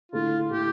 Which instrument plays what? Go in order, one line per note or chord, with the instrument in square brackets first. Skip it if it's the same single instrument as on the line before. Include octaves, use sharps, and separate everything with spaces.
[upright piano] D3 A3 E4 [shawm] F4
[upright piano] D3 A3 E4 [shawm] G4